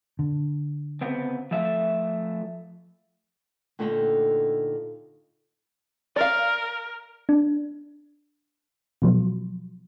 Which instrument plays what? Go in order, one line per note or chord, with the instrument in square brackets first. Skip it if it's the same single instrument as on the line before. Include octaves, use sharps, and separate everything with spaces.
[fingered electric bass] D3
[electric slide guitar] C#3 B3 C4
F3 A3 E5
[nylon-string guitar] A#2 D3 A3 D#4 F#5 G5
[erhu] A#4 [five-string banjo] D5 F5
[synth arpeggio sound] D4
B2 F3 F#3